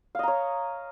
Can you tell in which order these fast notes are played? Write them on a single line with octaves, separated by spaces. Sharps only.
F5 D#5 A#5 C#5